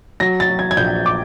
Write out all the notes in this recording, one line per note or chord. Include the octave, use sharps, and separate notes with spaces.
F#3 A#6
A6
F#3
G#6
G#6
A#1 G6
D6